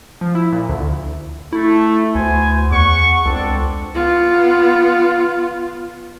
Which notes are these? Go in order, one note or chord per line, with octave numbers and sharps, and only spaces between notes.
F3
E4
A#2
D2
A3 E4
D2 B3 C5 G#5
E2 F#5 C#6
C#2 C4 D4 A4
B3 F4